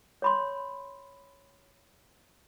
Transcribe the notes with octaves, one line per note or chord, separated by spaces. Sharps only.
C#5 B5 C6